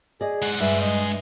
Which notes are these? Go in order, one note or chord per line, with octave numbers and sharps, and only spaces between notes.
G#4 D5 D#5
G#3 F#5
G2 E5
D#5